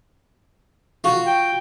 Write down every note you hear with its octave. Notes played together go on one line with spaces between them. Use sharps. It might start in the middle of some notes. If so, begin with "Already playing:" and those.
F4 F#4
G5